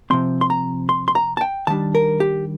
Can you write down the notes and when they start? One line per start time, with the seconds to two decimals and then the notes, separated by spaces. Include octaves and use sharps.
0.10 C3 F3 C4 C6
0.41 C6
0.50 A#5
0.89 C6
1.08 C6
1.15 A#5
1.37 A5
1.41 G5
1.67 D#3 G3 D4 A5
1.95 A#4
2.20 G4